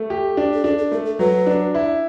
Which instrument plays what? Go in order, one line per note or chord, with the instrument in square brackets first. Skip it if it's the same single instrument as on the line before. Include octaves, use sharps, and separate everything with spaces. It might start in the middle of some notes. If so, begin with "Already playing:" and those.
Already playing: [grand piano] A3
G4
D4
[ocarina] A4
[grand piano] D4 [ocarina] G#4
[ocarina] A4
[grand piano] A3 [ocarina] A#4
[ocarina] A4
[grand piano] F#3 [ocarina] B4
[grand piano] D4
E4